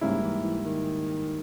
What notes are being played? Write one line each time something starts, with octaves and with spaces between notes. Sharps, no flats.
G#2 C#3 G3 A#3 E4
E3
E3
D#3